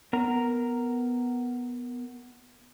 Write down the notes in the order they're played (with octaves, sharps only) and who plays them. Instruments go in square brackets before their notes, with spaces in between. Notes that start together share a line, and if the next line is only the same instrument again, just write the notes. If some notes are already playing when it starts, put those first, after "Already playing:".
[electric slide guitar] B3 A#4 A#5